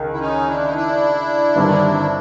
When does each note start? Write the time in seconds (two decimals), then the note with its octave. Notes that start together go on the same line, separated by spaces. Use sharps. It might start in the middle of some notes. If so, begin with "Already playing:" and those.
Already playing: C#2 D#3
0.12 E4
0.20 C#4 D#4
0.48 D4 E4
0.67 D#4
0.75 D4 E4
1.56 G1 G2 D#3 G3 C4